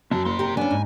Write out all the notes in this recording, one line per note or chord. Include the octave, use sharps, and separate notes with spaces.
F#2 C#4 A5
F#1 C3 C6
G4 A#4
B3 C#4 D4 G#5
G#2